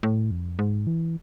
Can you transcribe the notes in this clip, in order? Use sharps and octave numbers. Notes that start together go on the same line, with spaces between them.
A2
F2
G#2
E3